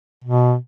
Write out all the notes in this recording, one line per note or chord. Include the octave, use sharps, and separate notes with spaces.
B2